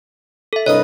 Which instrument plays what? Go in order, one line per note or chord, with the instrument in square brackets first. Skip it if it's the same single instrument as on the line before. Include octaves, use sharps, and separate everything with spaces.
[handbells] A4 E5
[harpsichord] C2 G2 D#6 [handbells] C#5 [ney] D#5